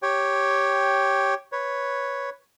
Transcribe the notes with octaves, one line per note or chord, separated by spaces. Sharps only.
G4 C#5 G5
B4 C#5